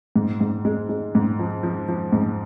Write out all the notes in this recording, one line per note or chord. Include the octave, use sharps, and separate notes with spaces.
G#2
G#2
G#3
G#3
G#2
F3
F3
F3
G#2